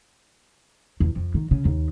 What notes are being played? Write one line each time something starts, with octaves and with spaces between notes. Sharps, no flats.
E2
F2
D#3
C#3
D#2